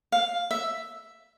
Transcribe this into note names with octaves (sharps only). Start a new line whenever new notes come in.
F5
E5